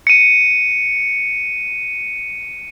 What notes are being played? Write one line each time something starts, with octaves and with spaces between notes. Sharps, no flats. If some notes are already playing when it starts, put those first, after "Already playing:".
C#7 D#7